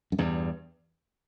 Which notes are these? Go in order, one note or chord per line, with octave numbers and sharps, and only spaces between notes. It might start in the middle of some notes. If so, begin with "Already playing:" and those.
F#2
E2 G2